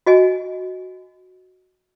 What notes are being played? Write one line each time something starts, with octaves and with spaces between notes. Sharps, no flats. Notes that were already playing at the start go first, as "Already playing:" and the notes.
F#4 D#5 G#5